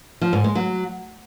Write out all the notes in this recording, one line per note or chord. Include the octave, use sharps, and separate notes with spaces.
F3
G#2
G#3
F#3